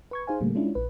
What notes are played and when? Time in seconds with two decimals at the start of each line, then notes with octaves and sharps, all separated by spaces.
0.11 B4 C#6 G#6
0.27 D#4 G#4 C5 F5 G#5
0.41 A#2 D3 G3 A3 A#3
0.55 G#3 C#4 D4 E4 F4
0.75 A#1 B4